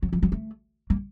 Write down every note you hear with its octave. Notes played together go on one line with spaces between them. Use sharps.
F#3
F3
F#3
A3
A#3